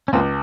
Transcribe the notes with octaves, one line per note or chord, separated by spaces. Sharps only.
C#4
C#2 A#3 C4